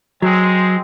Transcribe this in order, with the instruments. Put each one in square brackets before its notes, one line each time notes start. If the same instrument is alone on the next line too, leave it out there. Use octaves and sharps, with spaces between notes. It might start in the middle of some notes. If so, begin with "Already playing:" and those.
[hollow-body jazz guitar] F#3 [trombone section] G#3 C4